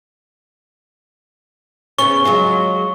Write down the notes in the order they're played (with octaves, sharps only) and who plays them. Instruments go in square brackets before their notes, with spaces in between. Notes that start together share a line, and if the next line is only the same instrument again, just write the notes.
[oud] C#3 B3 C#4 [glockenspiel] C#6 G7
[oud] F#3 G#3 F4